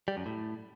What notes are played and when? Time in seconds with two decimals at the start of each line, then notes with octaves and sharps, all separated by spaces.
0.08 G3
0.17 F#2
0.26 A2